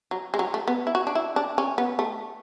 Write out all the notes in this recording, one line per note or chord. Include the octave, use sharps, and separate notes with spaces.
F#3
G#3
F#3
A3
B3
E4
F#4
D4
E4
D4
C#4
B3
A3